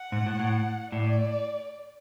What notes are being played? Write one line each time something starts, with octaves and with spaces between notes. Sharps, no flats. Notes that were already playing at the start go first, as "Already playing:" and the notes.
Already playing: F#5
G#2
A2
A2
A2 D5